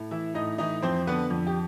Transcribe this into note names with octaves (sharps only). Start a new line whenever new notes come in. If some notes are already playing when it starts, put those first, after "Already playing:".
Already playing: A2
E3 E4 E5
A2 D#4 D#5
E3 D#4 D#5
F2 C4 C5
D3 B3 B4
F2
G4